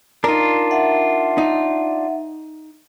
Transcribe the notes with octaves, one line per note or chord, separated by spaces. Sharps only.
D4 D#4 F4 A#4
E5 F#5
D#4